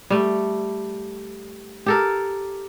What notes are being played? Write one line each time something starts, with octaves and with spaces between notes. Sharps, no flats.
G3 A3
G4 A4 A#4